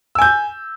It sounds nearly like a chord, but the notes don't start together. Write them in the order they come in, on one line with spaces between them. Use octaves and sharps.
E6 G#5 G6